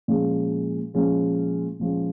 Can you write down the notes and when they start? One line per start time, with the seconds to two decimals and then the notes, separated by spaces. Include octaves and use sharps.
0.08 A#2 F3 G#3 C#4
0.94 A#2 F3 G#3 C#4
1.80 A#2 F3 G#3 C#4